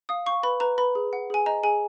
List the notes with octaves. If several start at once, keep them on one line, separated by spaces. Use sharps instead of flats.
F5 D#6
F5 C#6
B4 B5
B4 A#5
B4 B5
G#4
F#5
G#4 G#5
D#5 A#5
G#4 G#5